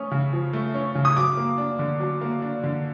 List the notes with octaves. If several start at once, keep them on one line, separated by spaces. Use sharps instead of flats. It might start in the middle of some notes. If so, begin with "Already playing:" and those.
Already playing: A3 C#4 D#6
C#3
F3
A3
C#4
C#3
D#6
F#3 D6
A#3
D4
D3
F#3
A#3
D4
D3